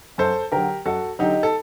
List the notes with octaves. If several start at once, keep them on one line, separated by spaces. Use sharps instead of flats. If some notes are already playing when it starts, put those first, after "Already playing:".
F#2 A4 C5
D3 F#3 G4 A#4
F#2 F#4 A4
D3 F#3 D#4 G4
A4